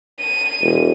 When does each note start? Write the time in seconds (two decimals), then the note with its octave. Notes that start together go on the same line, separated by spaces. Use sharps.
0.20 D#7
0.61 E1